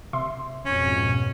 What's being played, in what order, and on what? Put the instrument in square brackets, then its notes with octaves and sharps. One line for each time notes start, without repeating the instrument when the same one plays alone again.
[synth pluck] C3 E5 C6
[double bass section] F2 G#2 B2 [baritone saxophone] C#4